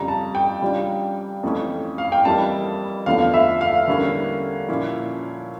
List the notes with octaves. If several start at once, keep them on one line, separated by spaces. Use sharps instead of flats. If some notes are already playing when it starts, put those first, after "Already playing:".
Already playing: F2 C#3 G3 A#5
A5
G5
C#3 G3 D4 F4
F2 E3 A3 C#4
F5
G5
F2 E3 G3 A#3 E4 A5
E2 D3 F3 A3 F5
E5
F5
D3 G3 A#3 C#4 E4
A#2 F3 C#4 E4